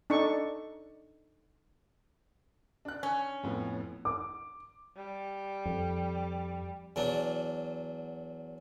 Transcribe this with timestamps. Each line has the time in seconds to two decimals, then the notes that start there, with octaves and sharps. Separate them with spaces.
0.10 D4 D#4 A4 C#6
2.85 D4 F#6
3.03 C#4
3.43 F2 A2 B3
4.05 D6
4.96 G3
5.66 F2
6.96 E2 F#3 D4